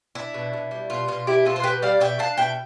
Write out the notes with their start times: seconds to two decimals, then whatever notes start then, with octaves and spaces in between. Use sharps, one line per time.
0.15 D4 E4
0.34 B2
0.53 B2
0.71 G3
0.90 B2 F4
1.08 B2 F4
1.27 B2 E4 G4
1.45 B2 F4 A4
1.56 C5
1.64 B2 G4 B4
1.82 G3 D5 F5
2.00 B2 E5 G5
2.19 D4 F5 A5
2.37 B2 E5 G5